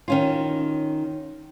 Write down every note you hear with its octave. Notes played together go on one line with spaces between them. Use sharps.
D#3 C#4 F4